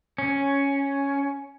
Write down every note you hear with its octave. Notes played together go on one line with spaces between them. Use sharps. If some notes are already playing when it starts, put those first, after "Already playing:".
C#4